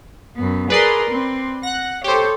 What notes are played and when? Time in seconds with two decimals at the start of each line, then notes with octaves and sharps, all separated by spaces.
0.36 F#2 B3
0.70 G#4 A#4 B4 D5 C6
1.10 C4
1.63 F#5 F#6 A#6
2.04 G4 A4 C5 C#5